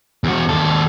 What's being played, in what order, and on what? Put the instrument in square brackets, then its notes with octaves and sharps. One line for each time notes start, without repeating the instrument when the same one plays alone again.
[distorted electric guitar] E2 F#4
D#2 A4